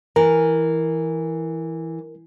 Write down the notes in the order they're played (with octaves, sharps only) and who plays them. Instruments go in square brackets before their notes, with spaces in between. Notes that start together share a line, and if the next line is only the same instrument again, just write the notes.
[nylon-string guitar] E3 [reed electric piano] A#4